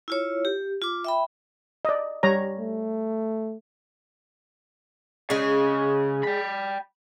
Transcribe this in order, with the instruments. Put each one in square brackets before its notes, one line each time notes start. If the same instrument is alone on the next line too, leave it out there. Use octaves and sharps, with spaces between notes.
[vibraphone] E4 F4 C#5
G4
F4 D6
E5 G5 B5
[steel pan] D5 D#5
G3 C#5 A#5
[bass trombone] A3
[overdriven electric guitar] C#3 [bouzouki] G#3 G#4
[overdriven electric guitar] G5 B5